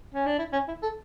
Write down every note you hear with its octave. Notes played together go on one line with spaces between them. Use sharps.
C#4
D4
E4
C#4
E4
A4